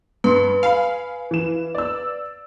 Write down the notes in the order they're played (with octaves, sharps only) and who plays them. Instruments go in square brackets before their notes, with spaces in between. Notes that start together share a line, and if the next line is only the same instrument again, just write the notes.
[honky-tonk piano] G2 C6 [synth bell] B4
[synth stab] F5 [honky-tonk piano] G#5 B5
[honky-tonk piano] E3 E7
D5 E6